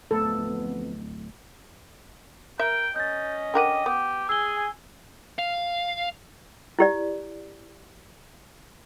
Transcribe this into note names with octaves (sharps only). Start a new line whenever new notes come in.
D1 F2 A3 B3 A4
A#4 E5 G5
C#4 D#5 G6 A6
D3 A#4 F#5 G5 D6 D#7
B3 G4
G#4 G#5 E6 G7
F5
E4 G4 D5